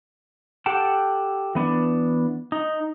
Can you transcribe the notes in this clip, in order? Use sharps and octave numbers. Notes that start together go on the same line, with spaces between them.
G4 A4 F#5 G5 A5
E3 B3 D4
D#4